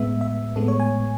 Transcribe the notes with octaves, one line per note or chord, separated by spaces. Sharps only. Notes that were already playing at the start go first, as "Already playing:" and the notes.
Already playing: A2 G#3 B3 E5
E5
A2 G#3 B3 A4
C#5
G#5